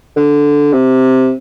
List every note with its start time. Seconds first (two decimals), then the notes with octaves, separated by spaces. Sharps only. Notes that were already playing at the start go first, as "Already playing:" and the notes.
0.16 D3
0.73 C3